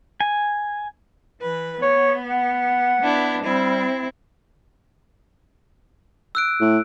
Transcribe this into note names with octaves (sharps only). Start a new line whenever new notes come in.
G#5
E3 B4
B3 C#5
F#5
B3 D4 E4
G3 C4 E4
E6 F#6 D7
A2